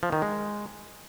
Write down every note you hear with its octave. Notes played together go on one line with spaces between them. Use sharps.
F3
D#3
G#3